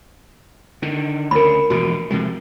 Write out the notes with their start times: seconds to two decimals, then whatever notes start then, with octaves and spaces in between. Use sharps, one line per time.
0.82 D3 D#3
1.31 D2 C#3 A#4 B5
1.70 E1 A#1 B2 F#4
2.10 C3 F3 G#3